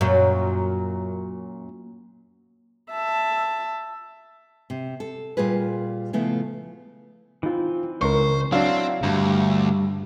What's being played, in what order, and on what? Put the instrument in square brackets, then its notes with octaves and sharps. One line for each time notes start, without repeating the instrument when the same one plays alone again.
[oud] F#2 A#2 F#3
[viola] E5 A5
[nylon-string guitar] C3
A4
A#2 G3 F4 G#4 B4
C#3 F3 A3 B3 E4
[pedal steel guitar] E3 C4 [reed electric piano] D#4 F4
[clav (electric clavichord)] C#2 [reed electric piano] A#4 C#6 [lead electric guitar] C5
[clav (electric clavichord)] F#3 D4 [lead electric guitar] C4 [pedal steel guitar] E4 A#5 [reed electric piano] F5
[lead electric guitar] D2 [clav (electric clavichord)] G2 [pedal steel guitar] G3 A#5